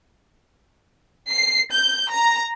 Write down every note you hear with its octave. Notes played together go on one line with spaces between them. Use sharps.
C7
G6
A#5